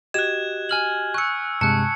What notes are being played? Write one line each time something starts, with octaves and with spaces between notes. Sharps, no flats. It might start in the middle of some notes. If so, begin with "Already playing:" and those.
F#4 G4 D#5 F#6 G#6 E7
G#5 F6 F#7
C#6 E6 F#6 C#7
G2 C3 G#3 A5 F#6 C#7